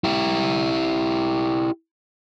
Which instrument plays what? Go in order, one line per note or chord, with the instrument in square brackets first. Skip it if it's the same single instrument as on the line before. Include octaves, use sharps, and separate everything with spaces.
[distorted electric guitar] E4 G4